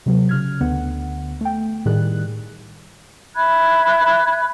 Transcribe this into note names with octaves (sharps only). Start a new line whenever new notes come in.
C3 F#3
C#3 F6 G#6
D2 D3 B3 F#5
A3 G5
A2 D#3 G3 G#4 F#6
E5 B5 F#6 G#6